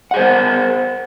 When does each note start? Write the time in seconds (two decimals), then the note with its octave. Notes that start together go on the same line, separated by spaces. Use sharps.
0.11 F#5
0.14 G#4
0.17 C5
0.19 A#4